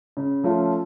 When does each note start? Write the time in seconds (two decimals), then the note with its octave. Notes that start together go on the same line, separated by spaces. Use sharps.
0.17 C#3
0.44 F3 A3 C#4 F4